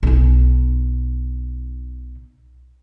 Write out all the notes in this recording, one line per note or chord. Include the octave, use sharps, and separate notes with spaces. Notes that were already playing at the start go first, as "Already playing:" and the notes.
B1 D#4